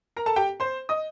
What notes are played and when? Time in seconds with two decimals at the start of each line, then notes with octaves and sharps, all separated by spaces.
0.16 A#4 A#5
0.26 A4 A5
0.36 G4 G5
0.60 C5 C6
0.89 D#5 D#6